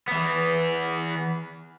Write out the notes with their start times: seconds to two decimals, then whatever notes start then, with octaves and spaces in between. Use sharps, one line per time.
0.08 E3 B3